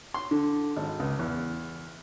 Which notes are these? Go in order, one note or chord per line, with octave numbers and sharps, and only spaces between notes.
C6
D3
G#1
C#2
E2